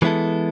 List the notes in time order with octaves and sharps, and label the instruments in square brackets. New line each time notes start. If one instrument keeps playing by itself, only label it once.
[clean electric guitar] E3 G#3 B3 E4 A4